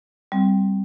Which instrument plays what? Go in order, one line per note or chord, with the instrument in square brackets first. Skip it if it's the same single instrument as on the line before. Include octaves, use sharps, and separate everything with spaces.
[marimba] G3 C4